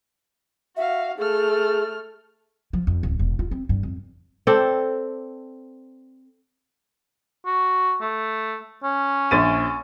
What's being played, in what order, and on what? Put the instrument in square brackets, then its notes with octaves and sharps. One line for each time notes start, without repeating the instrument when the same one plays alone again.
[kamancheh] F#4 F5 [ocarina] E5
[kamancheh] A3 F6 [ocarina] G#4
[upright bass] F3
F2
D1
E1
F4
C4
G2
F2
[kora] C4 A4 D5
[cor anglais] F#4
A3
C#4
[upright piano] A#1 A6 D#7